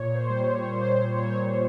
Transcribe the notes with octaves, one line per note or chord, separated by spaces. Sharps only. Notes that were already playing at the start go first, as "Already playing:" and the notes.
Already playing: A#2 C#5
C5
G3
C#5
A#2 C5
A#2 C#5